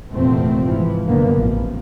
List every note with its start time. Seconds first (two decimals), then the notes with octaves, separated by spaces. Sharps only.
0.12 F1 E2 A#2 A3 C4
0.65 G#2 E3 F3
1.05 F#1 B2 D3 A#3 B3
1.35 A1 F3